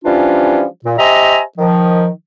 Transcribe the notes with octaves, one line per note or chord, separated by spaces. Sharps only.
E3 F3 G3 C#4 D4 F4
A#2
G4 C5 D#5 E5 G#5 A#5
D#3 F3